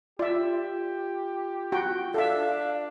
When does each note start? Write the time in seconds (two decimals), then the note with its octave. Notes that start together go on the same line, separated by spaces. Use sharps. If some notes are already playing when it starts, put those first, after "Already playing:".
0.19 F4 G4 D5 E5
1.72 F#4 G5
2.14 D4 A4 E5 F5